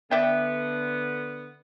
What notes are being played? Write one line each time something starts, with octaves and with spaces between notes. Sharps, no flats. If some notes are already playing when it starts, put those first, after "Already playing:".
D3 B3 D5 E5 G5